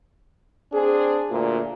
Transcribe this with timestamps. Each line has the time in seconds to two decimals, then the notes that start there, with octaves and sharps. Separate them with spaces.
0.73 C4 D4 G#4
1.31 D2 A#2